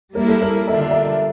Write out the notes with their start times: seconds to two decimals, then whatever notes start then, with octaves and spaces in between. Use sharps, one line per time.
0.15 G3 A#3 E4 A#4
0.28 A4
0.42 A#4
0.68 D3 G3 D4 F4 E5
0.91 E5